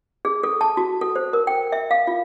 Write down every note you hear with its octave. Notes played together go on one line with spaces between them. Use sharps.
G#4
A4
A5
F#4
A4
C5
A#4
G5
E5
F5
F4